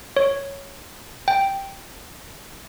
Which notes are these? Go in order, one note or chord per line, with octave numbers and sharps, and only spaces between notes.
C#5
G5